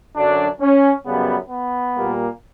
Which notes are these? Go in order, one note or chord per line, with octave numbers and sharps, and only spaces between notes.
F#2 D3 F#3 D4
C#4
F#2 C#3 G3 B3
B3
A#2 G3 A#3